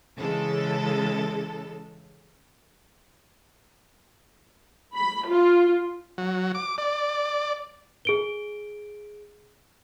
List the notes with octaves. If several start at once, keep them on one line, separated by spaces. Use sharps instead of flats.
C#3 E3 G#3 A4
B5
F4
F#3
D6
D5
G#4 D7 G7